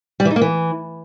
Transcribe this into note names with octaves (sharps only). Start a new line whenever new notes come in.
G3
E3
D#4
A#3
E3